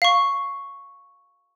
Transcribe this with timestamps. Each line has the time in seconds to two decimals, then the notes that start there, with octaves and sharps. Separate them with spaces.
0.02 F5 C#6